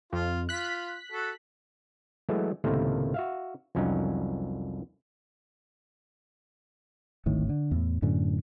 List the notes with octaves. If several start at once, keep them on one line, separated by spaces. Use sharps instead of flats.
F2 F4
F4 F#6 B6
F#4 A4
E3 F#3 G#3 A3
C#2 A2 C3 D#3 A3 A#3
F#4 E5 F5
C2 F2 F#3 C#4 D#4
D1 G#1 A2 D#3
D3
E2 A2
F#2 A2 D3 C#4